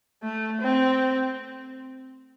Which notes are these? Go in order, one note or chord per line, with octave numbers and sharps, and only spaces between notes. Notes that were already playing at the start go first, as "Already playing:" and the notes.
A3
C4